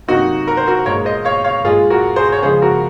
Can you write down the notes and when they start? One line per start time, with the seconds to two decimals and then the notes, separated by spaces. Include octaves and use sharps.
0.08 C3 F#3 A#3 D#4 F#4
0.47 A#4
0.57 C5
0.67 F#4 A#4
0.86 A#2 G#3 A#4 C#5
1.05 C5 D#5
1.25 C#5 F5
1.44 C#5 F5
1.64 A#2 G#3 F4 G#4
1.90 F#4 A#4
2.16 G#4 C5
2.32 C#5
2.42 C#3 F3 G#3 G#4 C5
2.62 F#4 A#4